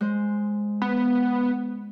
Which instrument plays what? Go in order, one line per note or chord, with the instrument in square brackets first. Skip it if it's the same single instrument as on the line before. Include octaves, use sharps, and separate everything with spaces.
[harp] G#3 C5
[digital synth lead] B3